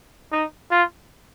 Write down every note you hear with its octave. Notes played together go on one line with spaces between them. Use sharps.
D#4
F4